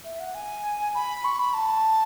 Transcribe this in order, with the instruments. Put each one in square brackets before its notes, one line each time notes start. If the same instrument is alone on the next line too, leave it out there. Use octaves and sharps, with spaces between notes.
[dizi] E5
F#5
G#5
B5
C#6
B5
A5